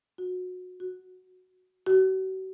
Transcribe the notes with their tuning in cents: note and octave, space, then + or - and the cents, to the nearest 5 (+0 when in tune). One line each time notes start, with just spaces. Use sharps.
F#4 -25
F#4 -5
F#4 +40